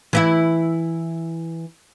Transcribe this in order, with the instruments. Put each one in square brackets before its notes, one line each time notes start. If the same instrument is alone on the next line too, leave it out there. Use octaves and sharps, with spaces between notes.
[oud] E3 E4 E5